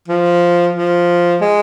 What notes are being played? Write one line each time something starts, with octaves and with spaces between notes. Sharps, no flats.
F3
F3
G#3